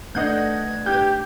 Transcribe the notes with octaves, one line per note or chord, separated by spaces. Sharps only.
G2 A3 D4 B4 D#5 F#5 G6 G#6
G4 G6